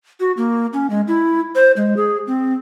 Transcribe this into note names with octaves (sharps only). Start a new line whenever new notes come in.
F#4
A#3
C#4
G#3
E4
C5
G#3
G#4
C4